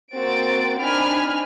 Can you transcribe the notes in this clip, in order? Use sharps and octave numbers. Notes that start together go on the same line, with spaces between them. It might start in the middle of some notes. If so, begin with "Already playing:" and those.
A#3 C4 F#4 A6 D7
C4 D4 D#4 G#5 B5 F6